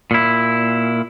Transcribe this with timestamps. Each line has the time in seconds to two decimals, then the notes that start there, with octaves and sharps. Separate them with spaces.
0.11 A#2 E4